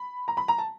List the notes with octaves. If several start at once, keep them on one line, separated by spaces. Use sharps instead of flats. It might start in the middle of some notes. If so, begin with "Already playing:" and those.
Already playing: B5
A#5
B5
A#5
A5